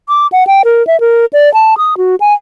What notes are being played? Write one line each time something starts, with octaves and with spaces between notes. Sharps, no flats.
D6
F#5
G5
A#4
E5
A#4
D5
A5
D#6
F#4
G#5